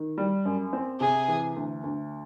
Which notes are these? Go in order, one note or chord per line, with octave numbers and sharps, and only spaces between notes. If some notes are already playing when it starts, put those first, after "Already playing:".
Already playing: D#3
G3
F#2
C4
C3 G#4
E3
D2
D2